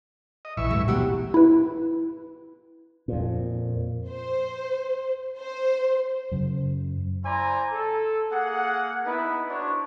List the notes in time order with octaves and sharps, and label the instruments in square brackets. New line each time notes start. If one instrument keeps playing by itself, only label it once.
[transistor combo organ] D#5
[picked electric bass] A#1 [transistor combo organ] E3 E5 C#6
[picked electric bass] D2 G#2 G3 [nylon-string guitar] A3
[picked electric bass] B2 E3 [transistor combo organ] F#3 [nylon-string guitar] B3 G4
[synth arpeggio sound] E4 B4
[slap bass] F2 A#2
[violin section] C5
C5
[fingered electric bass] F#2 C#3
[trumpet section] E4 C5 D5 G#5 A#5
A4
A#3 G#4 F#5
B3 D#4 E4 B4
D4 F#4 C5 C#5